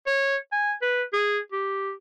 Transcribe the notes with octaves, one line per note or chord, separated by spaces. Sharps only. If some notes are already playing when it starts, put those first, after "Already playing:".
C#5
G#5
B4
G#4
G4